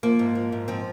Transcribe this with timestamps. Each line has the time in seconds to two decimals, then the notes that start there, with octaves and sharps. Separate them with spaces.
0.03 F3 A#3
0.19 G#2
0.35 F3
0.52 G#2
0.68 F3 C4